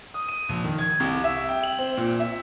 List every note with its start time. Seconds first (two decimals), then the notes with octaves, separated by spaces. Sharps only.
0.14 D#6
0.28 D#7
0.49 A#1
0.64 D#3
0.79 G#6
1.00 C2
1.24 E5
1.48 G5
1.63 F#7
1.79 C4
1.97 A#2
2.20 E5